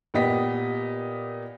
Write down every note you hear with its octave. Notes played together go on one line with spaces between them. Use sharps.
A#2 B3 G4 D#5 B6